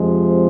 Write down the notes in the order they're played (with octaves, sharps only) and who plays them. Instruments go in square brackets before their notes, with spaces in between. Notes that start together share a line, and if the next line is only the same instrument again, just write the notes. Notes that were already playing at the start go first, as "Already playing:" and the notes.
Already playing: [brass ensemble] F2 C3 F3 G#3